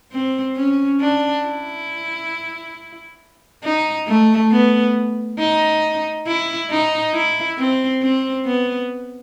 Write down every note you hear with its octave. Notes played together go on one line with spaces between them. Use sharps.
C4
C#4
D4
E4
D#4
A3
B3
D#4
E4
D#4
E4
C4
C4
B3